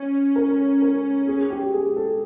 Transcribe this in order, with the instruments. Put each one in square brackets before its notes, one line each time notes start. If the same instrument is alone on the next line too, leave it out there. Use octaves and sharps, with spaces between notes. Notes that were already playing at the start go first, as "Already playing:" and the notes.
Already playing: [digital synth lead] C#4
[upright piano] A#4
A#4
G#4
G4
G#4
A4